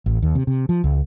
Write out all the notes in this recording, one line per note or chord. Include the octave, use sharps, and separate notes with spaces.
A1
D#2
C3
C3
F3
C#2